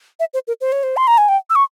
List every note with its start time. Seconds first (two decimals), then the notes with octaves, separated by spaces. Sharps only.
0.20 E5
0.34 C5
0.48 A#4
0.61 C5
0.72 C#5
0.83 C5
0.97 C6
1.07 A#5
1.18 G#5
1.29 G5
1.50 E6
1.56 C#6